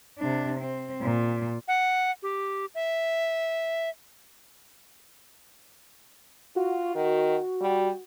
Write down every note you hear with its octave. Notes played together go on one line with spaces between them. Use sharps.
C3 D4
C4
A#2
F#5
G4
E5
F4 F#4
D#3
G3